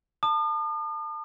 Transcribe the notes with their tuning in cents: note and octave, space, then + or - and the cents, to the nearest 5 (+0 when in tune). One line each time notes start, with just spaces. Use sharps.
A5 +20 D#6 -45